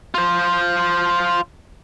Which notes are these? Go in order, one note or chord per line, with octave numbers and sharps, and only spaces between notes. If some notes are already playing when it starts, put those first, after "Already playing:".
F4 C5